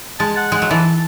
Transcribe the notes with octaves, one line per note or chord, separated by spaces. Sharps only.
G#3 A5
F#5
G#3 F#5
F#3
E3 A5